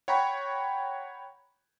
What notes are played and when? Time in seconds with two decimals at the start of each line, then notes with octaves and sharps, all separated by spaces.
0.08 C#5 F#5 G5 A#5 B5 C#6